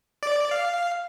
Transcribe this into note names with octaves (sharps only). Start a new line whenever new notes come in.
D5
F5